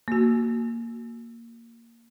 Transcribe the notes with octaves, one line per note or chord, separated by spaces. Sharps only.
A#3 F#4